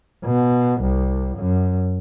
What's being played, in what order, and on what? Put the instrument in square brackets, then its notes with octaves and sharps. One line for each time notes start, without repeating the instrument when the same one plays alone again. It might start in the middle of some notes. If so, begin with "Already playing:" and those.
[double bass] B2
C2
F#2